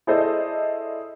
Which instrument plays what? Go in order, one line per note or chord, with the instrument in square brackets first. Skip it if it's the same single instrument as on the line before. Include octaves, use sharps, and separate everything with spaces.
[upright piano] E4 G#4 A4 C5 D5 D#5